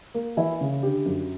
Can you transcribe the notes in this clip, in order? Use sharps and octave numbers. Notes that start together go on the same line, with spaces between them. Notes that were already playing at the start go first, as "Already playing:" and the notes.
A#3
E3 E4
C#3
D3 G4
F#2